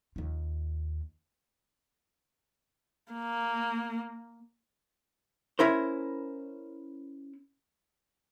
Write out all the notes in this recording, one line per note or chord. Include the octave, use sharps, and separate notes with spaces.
D#2 F4
A#3
C#4 E4 A#4 C5